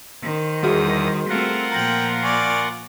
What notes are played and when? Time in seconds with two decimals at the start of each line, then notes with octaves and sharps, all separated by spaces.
0.23 D#3 C5
0.63 E2 G3 F#4 G#4 D#6
1.29 A3 C4 F4 A#4 F#5
1.72 A#2 F3 G5 A#5 A#6 F#7
2.24 D5 G#5 C#6